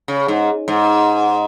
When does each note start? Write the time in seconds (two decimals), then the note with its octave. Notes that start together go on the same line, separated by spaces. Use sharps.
0.08 C#3
0.28 G#2
0.68 G#2